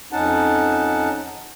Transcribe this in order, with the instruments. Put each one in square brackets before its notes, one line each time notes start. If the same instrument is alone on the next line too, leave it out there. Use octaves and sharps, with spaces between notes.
[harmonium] F2 C#4 D#4 F#5 A5